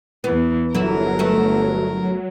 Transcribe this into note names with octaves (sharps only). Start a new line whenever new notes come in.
E2 E3 B3
G1 E3 F#3 E4 A4 A#4
A3 B3 F#4